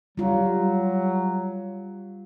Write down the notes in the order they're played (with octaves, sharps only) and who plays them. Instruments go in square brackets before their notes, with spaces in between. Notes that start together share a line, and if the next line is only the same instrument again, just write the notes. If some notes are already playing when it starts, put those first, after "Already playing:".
[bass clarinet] F#3 [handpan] G3 F4